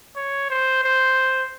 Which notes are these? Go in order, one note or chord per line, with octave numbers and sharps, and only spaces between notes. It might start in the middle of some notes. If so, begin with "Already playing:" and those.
C#5
C5
C5